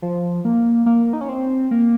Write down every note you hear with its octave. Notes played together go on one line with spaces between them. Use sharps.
F3
A#3
A#3
D#4
C#4
C4
A#3